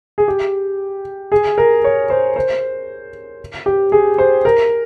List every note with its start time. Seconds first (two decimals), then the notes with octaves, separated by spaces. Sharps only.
0.18 G#4
0.28 G4
1.32 G#4
1.58 A#4
1.84 C#5
2.10 C5
2.36 C5
3.66 G4
3.92 G#4
4.18 C5
4.45 A#4